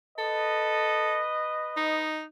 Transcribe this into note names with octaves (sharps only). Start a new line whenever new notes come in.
A4 B4 D#5
D#4